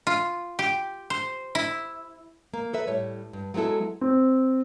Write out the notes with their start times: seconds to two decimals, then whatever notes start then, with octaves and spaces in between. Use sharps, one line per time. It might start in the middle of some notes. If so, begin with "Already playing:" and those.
0.07 F4
0.59 G4
1.10 C5
1.55 E4
2.53 A#3
2.73 A4 B4 E5
2.87 A2 G3 C#5
3.33 G2
3.54 F#3 G#3 B3 E4 A4
4.01 C4